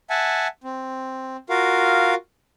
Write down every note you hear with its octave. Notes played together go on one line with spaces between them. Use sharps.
E5 F#5 G#5 A5
C4
F4 F#4 A#4 F5